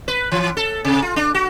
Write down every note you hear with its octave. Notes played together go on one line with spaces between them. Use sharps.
B4
E3
A4
C3
F4
D4
F#4